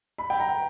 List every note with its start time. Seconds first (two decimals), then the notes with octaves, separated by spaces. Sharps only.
0.18 B5
0.30 G5
0.40 A#5